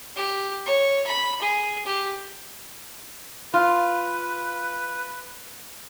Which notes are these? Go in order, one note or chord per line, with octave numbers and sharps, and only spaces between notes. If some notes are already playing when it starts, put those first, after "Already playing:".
G4
C#5
B5
G#4
G4
F4 B4